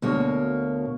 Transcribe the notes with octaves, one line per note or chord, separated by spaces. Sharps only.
D2 B2 A#3 C#5